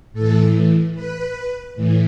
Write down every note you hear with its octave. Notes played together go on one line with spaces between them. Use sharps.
A2 E3 A4
B4
A2 E3